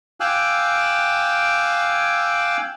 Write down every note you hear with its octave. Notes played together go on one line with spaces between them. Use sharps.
F5 G5 G#5 D6 E6 F#6